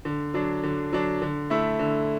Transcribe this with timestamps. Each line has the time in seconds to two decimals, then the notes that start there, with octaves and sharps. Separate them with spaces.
0.05 D3
0.34 F#3 D4
0.64 D3
0.93 F#3 D4
1.22 D3
1.50 A3 E4
1.79 D3